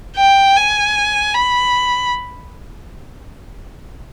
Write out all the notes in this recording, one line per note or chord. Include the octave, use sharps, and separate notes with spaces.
G5
G#5
B5